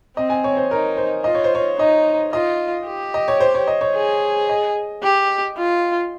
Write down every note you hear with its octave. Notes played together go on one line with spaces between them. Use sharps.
C4 D#5
G#5
C#5
C5
D#4 A#4
C5
F4 D#5
C#5
C5
C#5
D#4 D#5
F4 D#5
G4
D#5
C#5
C5
C#5
D#5
C#5
G#4
D#5
G4
F4